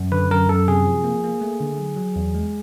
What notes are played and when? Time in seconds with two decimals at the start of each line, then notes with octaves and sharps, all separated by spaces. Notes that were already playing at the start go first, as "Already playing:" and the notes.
Already playing: F#2
0.12 D3 B4
0.31 F#2 A#4
0.49 F#2 A4
0.68 C3 G#4
0.87 F3
1.04 A#3
1.24 A#3
1.41 A3
1.61 D3
1.78 F#3
1.96 F#3
2.16 E2
2.35 G#3